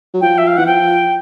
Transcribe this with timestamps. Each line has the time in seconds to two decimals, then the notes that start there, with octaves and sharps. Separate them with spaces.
0.14 F#3
0.21 F3 G5
0.38 E5
0.47 F5
0.57 E3 F#5
0.66 F3 G5